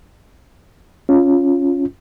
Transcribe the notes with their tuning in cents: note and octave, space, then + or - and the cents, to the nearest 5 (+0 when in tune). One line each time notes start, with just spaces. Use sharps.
C#4 +0 F4 +0